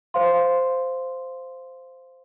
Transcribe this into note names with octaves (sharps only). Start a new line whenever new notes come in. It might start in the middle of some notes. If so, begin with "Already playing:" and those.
C5 F5 C6